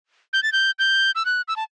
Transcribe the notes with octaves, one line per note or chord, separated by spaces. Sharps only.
G6
A6
G6
G6
E6
F#6
E6
A5